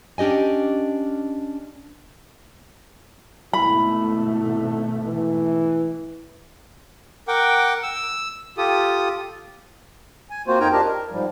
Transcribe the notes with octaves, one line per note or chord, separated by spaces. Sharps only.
C#4 D4 G4 D#5 G#5
G#1 B2 A3 E4 B5
E3
A#4 F#5 G5 D6
E6
F4 G4 A4 D#6
G#5
A#3 C4 F4 F#4 C5
F2 D#4 A#4 G5 G#5 A#5
D4 F4 G4 A#4 D#5 A5
A#4
G#2 F3 G3